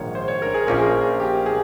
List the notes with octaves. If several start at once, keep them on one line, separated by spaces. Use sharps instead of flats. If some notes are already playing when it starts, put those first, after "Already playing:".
Already playing: A#1 G#2 D#3 C#5
C5
C#5
A#4
G#4
A#1 A#2 F3 A#3 C#4 A#4
G#4
G4
G#4